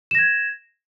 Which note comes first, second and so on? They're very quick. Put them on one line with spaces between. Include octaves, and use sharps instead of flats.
E7 A#6 G#6